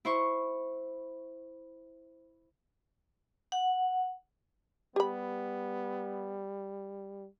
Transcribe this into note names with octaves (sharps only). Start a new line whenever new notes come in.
E4 C5 C#6
F#5
G3 B3 G4 B5